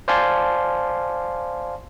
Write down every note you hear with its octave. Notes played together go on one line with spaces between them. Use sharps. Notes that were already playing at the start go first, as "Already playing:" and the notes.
C5 D5 F5 G#5 A5 C6